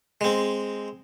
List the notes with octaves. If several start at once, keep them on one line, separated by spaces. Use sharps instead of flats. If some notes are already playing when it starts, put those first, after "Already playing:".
G#3 C4